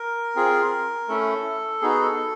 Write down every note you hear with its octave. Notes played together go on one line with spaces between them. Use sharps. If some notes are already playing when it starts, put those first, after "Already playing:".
Already playing: A#4
C4 F4 G#4
A3 C#4 E4 A4
B3 D#4 F#4 G#4
A4